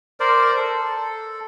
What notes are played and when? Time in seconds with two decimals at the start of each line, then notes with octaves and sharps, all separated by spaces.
0.20 A#4 C5 D5
0.57 A4